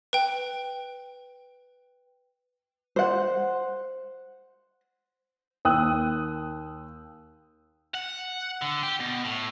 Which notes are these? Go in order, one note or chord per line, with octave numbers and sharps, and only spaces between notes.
B4 G5
C5 F#5
D#2 G5 D#6 E6 F#6
F#5
D3
G4
B2
A2